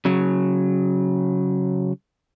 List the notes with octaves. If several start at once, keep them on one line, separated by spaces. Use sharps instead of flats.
C#3 F#3